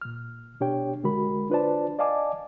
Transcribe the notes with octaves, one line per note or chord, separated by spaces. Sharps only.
A#2 F6
B2 D4 G4 C#5 G5
C2 D3 G#3 F#4 A#4 B5
D4 F4 B4 C5 D5 A5
D5 D#5 F5 G#5 A5 D6